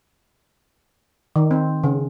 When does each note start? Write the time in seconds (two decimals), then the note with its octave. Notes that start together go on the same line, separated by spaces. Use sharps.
1.36 D#3
1.51 C4
1.84 C#3